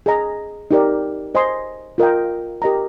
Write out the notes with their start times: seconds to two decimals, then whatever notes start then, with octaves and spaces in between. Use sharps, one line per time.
0.06 G#4 D#5 A#5
0.71 D#4 G4 A#4 D5
1.35 C5 D#5 G#5 C6
1.98 F4 A#4 D#5 G5
2.62 G4 A#4 D#5 A#5